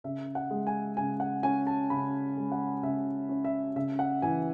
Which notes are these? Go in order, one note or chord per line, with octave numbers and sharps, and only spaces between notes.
C#3 E5
F#5
G#3
G#5
C#3 G#5
F#5
C#4 G#5
A5
C#3 B5
G#3
F#5
C#3 E5
C#4
E5
C#3 E5
F#5
E3 G#5